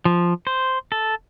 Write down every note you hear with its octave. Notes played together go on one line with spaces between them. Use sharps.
F3
C5
A4